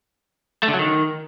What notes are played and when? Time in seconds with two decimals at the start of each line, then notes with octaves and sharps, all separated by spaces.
0.63 A3
0.68 D3
0.74 F#3
0.79 D#3